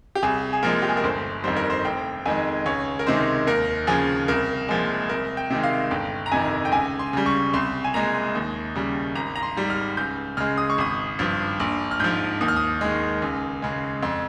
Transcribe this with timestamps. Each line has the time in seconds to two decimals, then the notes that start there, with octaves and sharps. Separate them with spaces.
0.15 G4
0.23 C2 G#4
0.53 G#4
0.63 A#2 F3 G#3 A#4
0.82 G4
0.89 G#4
0.97 A#4
1.04 G1 C5
1.44 F2 D#3 G3 C5
1.57 A#4
1.70 C5
1.85 F1 G5
2.26 F2 D#3 G#3 G#5
2.66 C#2 C#5
2.99 A#4
3.06 C3 D#3 G#3 C5
3.47 D#2 A#4
3.87 C#3 F3 G#4
4.28 C2 A#4
4.69 A#2 F3 G#3 G#4
5.09 C2 A#4
5.37 G5
5.50 C3 D#3 G#3
5.63 F5
5.91 G1 G5
6.26 A#5
6.32 F2 C3 D#3 G#5
6.65 G5
6.72 C#2 G#5
6.99 C6
7.13 C#3 G3
7.26 C#6
7.54 C2 C6
7.84 G#5
7.94 A#2 G#3 A#5
8.35 D#2
8.76 C#3 G3
9.15 G#1 A#5
9.36 A#5
9.43 C6
9.56 G#2 G3
9.70 F6
9.97 C#2 G6
10.37 C#3 G#3 F6
10.57 D#6
10.70 C#6
10.78 G#1 D#6
11.19 G2 F3
11.60 A#1
11.91 F6
12.00 G#2 F3 G6
12.41 D#2 D#6
12.48 F6
12.56 D#6
12.81 D#3 G#3
13.22 C#2
13.62 C#3 G#3
14.03 F2 C6